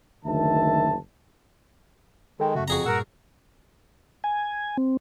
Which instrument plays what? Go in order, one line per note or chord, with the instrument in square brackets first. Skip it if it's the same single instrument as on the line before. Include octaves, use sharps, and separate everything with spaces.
[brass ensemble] F#1 D2 D#3 E5 A5
[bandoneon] D#3 G#3 [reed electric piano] A4 G5
[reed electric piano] F#2 C#3 [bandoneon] A3 F#4
[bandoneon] F2 [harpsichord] F#4 G#4 A#5
[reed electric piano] G2 A#2 [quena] A#4 [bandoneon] F#5 E6
[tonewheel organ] G#5
C4